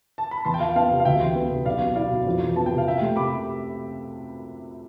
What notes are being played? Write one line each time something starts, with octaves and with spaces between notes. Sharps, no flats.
A5
B5
E2 A5 C6
G5
F3 F5 A5
B3 F5 A5
C3
F5
D2 E5 G5
E3
B3
C3
B1 D5 F5
B3
E4 D5 F5
B2
F2
E3
B3 A5
G5
C3
F5
C3 E5 G5
A3
C3 B5 D6